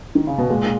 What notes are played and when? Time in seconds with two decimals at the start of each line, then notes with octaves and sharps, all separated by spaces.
0.15 D#3
0.27 C#3
0.38 B2
0.50 A#2 G#3